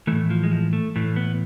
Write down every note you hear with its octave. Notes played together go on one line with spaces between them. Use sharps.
A2 E3 A3
F3
G#3
F3
A3
A2 E3 A3
B3